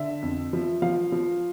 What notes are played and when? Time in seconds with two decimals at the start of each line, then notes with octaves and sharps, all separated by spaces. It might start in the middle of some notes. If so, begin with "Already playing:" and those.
Already playing: D3 E5
0.22 F2
0.53 F3
0.82 F3 F5
1.12 F3